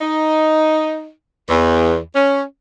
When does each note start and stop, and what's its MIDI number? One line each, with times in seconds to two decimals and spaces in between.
0.01 1.11 63
1.48 1.97 40
2.15 2.42 61